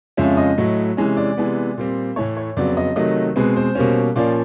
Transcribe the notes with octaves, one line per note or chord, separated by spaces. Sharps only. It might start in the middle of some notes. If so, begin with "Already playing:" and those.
F2 C#3 F3 G#3 C#4 E5
D#5
A2 F#3 A3
C3 E3 G#3 C#4
D5
C3 E3 G#3 B3
A#2 G3 C4
A2 E3 A3 C#5
C#5
F2 C#3 F#3 B3 D5
D#5
C3 D#3 F#3 A3 D#5
B2 G#3 C4 B4
C5
B2 G3 A#3 C#4
A#2 F3 A#3 C#4 D5